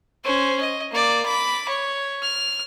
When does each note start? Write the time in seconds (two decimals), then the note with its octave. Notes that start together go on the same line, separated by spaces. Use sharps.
0.24 C#4 C5
0.60 D#5
0.91 A#3 D5
1.25 B5 D6
1.68 C#5
2.22 F6